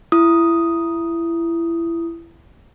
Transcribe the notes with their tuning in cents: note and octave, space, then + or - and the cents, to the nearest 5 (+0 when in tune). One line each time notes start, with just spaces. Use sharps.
E4 +25 D#6 +0